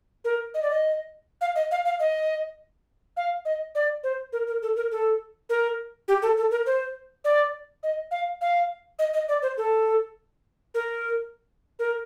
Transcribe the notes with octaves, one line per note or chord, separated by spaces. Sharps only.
A#4
D#5
D5
D#5
F5
D#5
F5
F5
D#5
F5
D#5
D5
C5
A#4
A#4
A4
A#4
A4
A#4
G4
A4
A4
A#4
C5
D5
D#5
F5
F5
D#5
D#5
D5
C5
A4
A#4
A#4